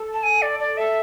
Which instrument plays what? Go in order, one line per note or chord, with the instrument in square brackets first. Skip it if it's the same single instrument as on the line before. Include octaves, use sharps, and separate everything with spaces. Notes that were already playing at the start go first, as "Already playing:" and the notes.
Already playing: [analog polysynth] A4
[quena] A5
G#5
D5
D5
[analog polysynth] A4 [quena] E5